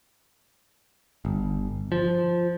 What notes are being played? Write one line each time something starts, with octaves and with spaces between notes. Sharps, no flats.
G1
F3